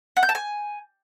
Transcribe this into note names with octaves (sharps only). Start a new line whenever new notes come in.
F#5
G6
A5
G#5